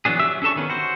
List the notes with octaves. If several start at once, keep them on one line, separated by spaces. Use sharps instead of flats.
E3 F#3 B3 D4 G#4
F#3 G4 E5 E6
C#4 D4 A4 A5 C#6
D#3 B3 C#4
F#4 C5